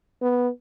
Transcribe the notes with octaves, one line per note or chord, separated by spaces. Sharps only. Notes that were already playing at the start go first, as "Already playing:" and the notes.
B3